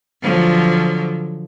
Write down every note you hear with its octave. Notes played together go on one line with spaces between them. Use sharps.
D3 F3 F#3